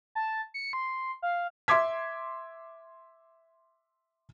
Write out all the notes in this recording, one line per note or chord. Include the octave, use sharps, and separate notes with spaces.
A5
C#7
C6
F5
E5 C6 D6 G#6 B6